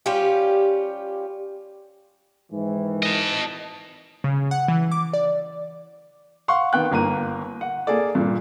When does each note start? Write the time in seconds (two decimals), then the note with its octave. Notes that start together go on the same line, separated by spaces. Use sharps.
0.06 G3 C#4 F4 G4
2.51 G#2 D#3 E3
3.03 D#5 A5
4.24 C#3
4.51 F#5
4.68 E3
4.92 D6
5.13 D5
6.48 F5 F#5 C6 C#6
6.73 D#3 B3 G5 F#6
6.91 G1 A#3 A#5 D#7
7.61 F#5
7.87 A#3 G#4 A4 D5
8.15 G2 A#2